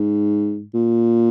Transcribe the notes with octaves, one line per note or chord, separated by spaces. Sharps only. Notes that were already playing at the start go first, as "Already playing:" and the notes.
Already playing: G#2
A#2